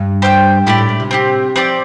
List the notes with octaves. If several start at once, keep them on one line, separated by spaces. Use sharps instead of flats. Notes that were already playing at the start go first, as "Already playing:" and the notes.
Already playing: G2
G4 C5 E5 G5
A2 E4 G4 D5
A2
A2
C3
C4 E4 G4
F3 C4 G4 D5